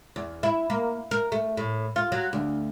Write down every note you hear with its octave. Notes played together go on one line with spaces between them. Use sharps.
E2
E4
A#3
A#4
A3
A2
F4
F#3
D2